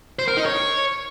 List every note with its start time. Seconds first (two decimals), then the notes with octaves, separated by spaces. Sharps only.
0.19 C5
0.28 A#4
0.37 D#4
0.46 C#5